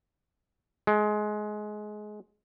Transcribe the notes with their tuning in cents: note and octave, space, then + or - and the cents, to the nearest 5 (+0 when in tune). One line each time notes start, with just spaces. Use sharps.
G#3 +20